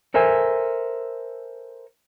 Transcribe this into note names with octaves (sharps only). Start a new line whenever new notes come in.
A4 A#4 C5 E5 G#5